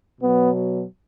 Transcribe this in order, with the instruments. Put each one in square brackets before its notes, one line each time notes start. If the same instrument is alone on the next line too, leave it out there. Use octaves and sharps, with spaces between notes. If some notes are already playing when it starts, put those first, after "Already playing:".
[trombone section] B2 F#3 B3